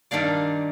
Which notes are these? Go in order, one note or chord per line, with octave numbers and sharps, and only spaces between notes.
G2 D#3 A#3 D4 D5 F5